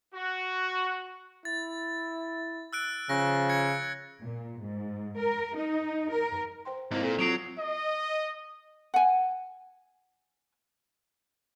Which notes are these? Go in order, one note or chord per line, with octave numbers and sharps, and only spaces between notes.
F#4
E4 A6
E6 F#6 D7
C#3 F3 A#6
G#6 C#7
A#2
G#2
A#4
D#4
A#4
C5 G5 C6
G#2 A#3 C4 E4 C5
A#2 A4
F#3 C4 F4 C7 D7 F7
D#5
F#5 G#5